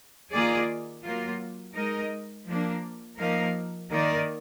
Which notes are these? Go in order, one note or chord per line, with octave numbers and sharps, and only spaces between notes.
D#3 A#3 F4 G#4 D5
F#3 A#3 F4
G#3 D#4 A#4 D#5
F3 A#3 D4
F3 A#3 D#4 A#4 F5
D#3 A#3 D#4 A#4 D5